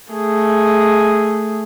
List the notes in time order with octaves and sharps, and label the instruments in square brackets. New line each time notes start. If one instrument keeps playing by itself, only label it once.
[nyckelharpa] A3 G#4